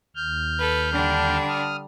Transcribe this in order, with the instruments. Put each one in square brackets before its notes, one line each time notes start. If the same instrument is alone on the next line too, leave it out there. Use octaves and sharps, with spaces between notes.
[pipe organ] D#2 F6 G6
[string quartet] A4 B4
D3 G3 D4
[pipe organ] D#6 F6